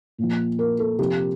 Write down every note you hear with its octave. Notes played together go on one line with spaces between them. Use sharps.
A#2 F3
A#4
A4
C3 F3 G4